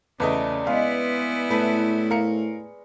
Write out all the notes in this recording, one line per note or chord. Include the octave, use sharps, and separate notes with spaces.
E2 C#3 A3 B4 D5 D#5
G#3 B3 E4 F5
A2 A3 B4
A#4 F5 C#7